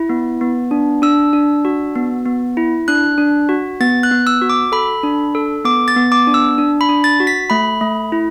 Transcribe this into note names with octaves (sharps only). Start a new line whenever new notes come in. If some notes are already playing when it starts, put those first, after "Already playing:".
Already playing: E4
B3
B3
D4
D4 E6
D4
F#4
B3
B3
E4
D4 F#6
D4
F#4
B3 A6
F#6
B3
E6
F#4
D6
A4 B5
D4
A4
B3 D6
A6
B3
D6
D4
E6
D4
B5
D4
A6
F#4
B6
A3 B5
A3
E4